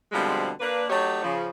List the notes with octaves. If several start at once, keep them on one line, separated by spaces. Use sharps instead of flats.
B2 D3 F3 G3 G#3 C4
A#3 D4 B4
F#3 A3 D#4 G4 C#5
C#3 F3